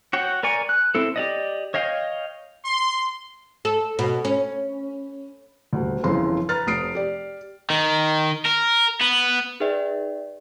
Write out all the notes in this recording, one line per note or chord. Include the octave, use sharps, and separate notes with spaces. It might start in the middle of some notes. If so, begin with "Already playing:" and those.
F#4 C#5 G5
A#4 D5 G#5 C#6
F#6
C4 E4 A4
G4 D5 D#5
C#5 D#5 F5 G5
C6
A4
B2
C#4
D#1 D2
G1 F2 C#3 E3 F4 C6
B4 A#5 F6 A6
F1 D#6 C7 D7
G4 D5
D#3
A#4
B3
D#4 G#4 B4 D5 E5 G5